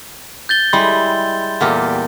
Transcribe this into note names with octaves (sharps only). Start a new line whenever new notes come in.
G6 A6 G7
G3 G#3 E4 C6
E2 A#2 G4